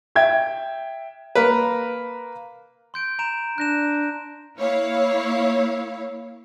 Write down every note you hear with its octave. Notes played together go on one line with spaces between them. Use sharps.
E5 G5 G#6
A#3 A#4 B4
C6 G6 D7
A#5 D7 E7
D4 F#6 A#6 E7
A#3 E4 C#5 F5